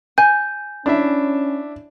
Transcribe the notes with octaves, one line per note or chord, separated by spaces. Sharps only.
G#5 G6
C#4 D4 E4 E5